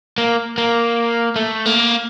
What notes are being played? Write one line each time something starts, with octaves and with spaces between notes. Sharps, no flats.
A#3
A#3
A3
A#3